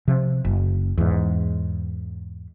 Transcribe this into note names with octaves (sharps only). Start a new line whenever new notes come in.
C3 F3
F#1
E2 G#2